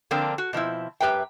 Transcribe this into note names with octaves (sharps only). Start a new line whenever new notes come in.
D3 F3 A#3 C4 D4
F#4
B2 F3 C4 E4
F#2 G4 B4 E5 G5